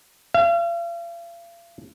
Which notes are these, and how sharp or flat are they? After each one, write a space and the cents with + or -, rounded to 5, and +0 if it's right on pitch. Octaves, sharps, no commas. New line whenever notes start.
F5 -40